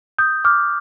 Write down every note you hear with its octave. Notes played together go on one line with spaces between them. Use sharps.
D#6 G6
D6 F6